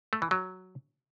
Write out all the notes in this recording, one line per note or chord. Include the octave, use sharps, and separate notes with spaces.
A3
E3
F#3